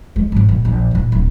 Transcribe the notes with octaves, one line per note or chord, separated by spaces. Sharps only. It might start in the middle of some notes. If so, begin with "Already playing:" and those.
G#3
G#2 C3
A#2
A#1
A#2 E4
D1